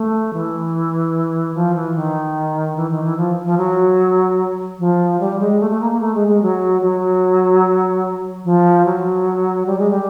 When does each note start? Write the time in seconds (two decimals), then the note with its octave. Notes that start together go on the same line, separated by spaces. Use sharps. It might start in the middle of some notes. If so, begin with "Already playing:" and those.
Already playing: A3
0.33 E3
1.55 F3
1.75 E3
1.95 D#3
2.77 E3
2.90 D#3
3.04 E3
3.17 F3
3.44 F3
3.58 F#3
4.79 F3
5.20 G3
5.40 G#3
5.60 A3
5.70 A3
5.80 A#3
5.91 A#3
6.01 A3
6.14 G#3
6.28 G#3
6.42 F#3
6.82 F#3
8.44 F3
8.85 F#3
9.66 G3
9.78 G#3
9.90 G3